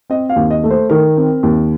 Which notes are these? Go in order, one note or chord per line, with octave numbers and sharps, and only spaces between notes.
C4 D#5
F5
D#2
D#5
A3
C5
D#3 A#4
C4
D#2